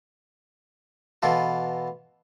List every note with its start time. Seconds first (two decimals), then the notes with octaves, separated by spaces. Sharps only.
1.22 B2 E3 F4 A4